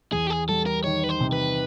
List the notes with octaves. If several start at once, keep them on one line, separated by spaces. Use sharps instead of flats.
E2 G#4
G4
G#4
G3 A4
A#4
D#3 C#5
B4
C5
C3
B4